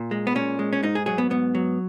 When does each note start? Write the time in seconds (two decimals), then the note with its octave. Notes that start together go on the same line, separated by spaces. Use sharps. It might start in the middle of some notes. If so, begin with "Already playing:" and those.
Already playing: A#2
0.11 G#3
0.27 B3
0.35 A#2 C#4
0.59 G#3
0.73 C#4
0.83 G#2 D#4
0.95 G#4
1.06 F#3 G#4
1.18 B3
1.30 G#2 B3
1.55 F#3